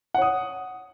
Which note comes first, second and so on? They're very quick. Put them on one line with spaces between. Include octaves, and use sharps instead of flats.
F#5 C#5 D#6